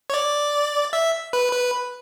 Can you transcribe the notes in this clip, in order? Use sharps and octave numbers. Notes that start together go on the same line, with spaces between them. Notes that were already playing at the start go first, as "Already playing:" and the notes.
C#5
D5
E5
B4
B4